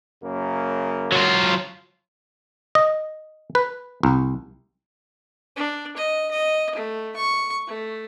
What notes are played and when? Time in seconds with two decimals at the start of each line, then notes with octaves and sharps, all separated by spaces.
0.23 F#2 C#3 A#3
1.12 F#3 F4
2.75 D#5
3.55 B4
4.03 C2
5.56 D4
5.97 D#5
6.31 D#5
6.75 A3
7.16 C#6
7.67 A3